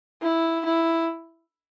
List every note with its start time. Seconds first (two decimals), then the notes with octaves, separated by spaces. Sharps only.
0.22 E4
0.65 E4